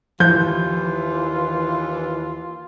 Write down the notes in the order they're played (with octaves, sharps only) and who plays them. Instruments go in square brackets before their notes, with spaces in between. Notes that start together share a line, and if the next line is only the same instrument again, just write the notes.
[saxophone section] D#2 E3 [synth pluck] F3 [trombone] F4 [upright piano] G6